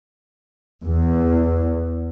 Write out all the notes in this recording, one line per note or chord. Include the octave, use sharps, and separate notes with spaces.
E2